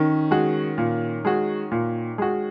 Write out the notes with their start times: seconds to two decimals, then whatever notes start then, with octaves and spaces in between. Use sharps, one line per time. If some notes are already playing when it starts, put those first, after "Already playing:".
Already playing: D#3 C#4
0.31 G#3 F#4
0.78 A#2
1.25 G#3 F#4
1.71 A#2
2.18 G#3 F#4